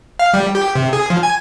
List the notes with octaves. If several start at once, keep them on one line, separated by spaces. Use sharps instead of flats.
F5
G3
G4
C3
G#4
F3
G#5